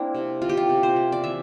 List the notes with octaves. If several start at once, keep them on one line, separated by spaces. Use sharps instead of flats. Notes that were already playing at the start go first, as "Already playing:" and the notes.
Already playing: A#3 C4 D4 E4
C3
C3 F4
G4
F4
C3
C5
A#3
D5
E3 E5